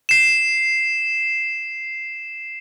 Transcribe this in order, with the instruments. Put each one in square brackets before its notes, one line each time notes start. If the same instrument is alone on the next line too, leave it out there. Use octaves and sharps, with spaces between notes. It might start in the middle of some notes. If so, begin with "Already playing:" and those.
[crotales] C7 E7